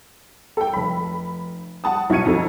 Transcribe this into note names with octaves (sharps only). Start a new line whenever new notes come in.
A4 G5
F1 B5
F#5 A5 D#6
B1 D#4 C#6 G#6 C#7 D#7
F2 D#4 A4